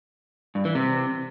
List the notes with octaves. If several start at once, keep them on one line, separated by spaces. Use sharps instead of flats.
G2
E3
C3